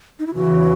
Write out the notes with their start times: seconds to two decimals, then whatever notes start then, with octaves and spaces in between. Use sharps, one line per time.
0.19 D#4
0.27 E4
0.35 E2 C#3 E3 F#4